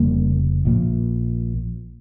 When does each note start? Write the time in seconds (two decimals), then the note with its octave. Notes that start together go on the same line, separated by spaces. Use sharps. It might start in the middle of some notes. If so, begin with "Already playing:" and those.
Already playing: F1 C#3 G3 A#3
0.65 A#1 A#2